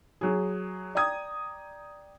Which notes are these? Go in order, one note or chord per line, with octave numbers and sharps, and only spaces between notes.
F#3 G#4
D5 G5 A#5 D#6 G#6